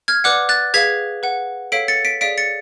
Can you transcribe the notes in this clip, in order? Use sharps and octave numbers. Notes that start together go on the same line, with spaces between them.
F6 G#6
B4 D5 F#5 D6 F#6
F#6 A6
G#4 B4 F5 G#6 B6
B4 F#5
A4 C#5 F5 B6 D7
A6 C#7
B6 D7
G#4 D5 F5 B6 D7
A6 C#7